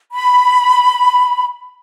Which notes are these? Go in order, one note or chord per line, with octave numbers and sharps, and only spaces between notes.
B5